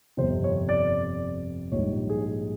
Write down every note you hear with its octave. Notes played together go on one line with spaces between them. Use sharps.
G1 F2 C3 C5
C#5
D5
A#1 G#2 D#3 G3 C#5
G#4